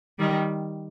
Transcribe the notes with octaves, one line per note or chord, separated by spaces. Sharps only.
D#3 G3